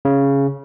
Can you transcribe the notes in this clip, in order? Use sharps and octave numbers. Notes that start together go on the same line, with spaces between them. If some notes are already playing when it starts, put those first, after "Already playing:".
C#3